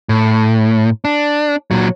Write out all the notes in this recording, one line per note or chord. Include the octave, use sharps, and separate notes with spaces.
A2
D4
A#2 F#3